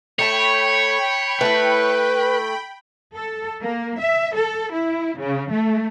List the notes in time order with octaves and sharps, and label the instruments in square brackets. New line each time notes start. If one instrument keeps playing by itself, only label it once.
[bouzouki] A3 A5 [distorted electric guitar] C#5 [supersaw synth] G5 B5
[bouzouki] A3 E4 [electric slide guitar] B4
[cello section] A4
A#3
E5
A4
E4
C#3
A3